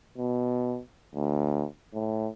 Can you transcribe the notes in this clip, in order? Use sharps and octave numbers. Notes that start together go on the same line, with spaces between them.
B2
D2
A2